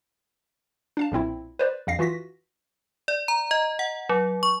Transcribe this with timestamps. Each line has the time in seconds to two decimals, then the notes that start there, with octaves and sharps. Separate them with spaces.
0.97 D4 F5 A5
1.12 B1 A#2 C4 E4
1.59 B4 C5 D5
1.87 A#1 F2 F5 A#6 C7
1.99 E3 F4 F#4 A#6 B6
3.08 D5
3.28 A#5
3.51 D#5
3.79 F#5
4.09 F#3
4.43 C#6